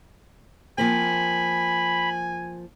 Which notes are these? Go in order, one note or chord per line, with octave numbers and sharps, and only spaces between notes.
F3 A#3 C4 G#5 B5